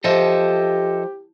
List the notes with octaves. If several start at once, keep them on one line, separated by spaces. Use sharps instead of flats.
F3 G4 A4 D#5 E5